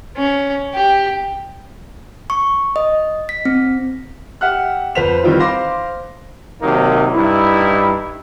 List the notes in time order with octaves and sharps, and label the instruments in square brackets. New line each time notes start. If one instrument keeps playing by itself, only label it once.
[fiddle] C#4
G4
[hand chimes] C#6
D#5
B6
C4
[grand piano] G4 E5 F#5 F6 F#6
F2 B4 C5 B6 F7
D#3 E3 G3 C4 D#4 F4
C5 F5 B5 C6 D6 A#6
[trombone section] C3 D#3 F#3 A#3 D#4
G2 D#4 E4